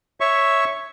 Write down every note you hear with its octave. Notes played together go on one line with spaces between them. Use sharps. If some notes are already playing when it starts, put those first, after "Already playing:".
C#5 E5 C#6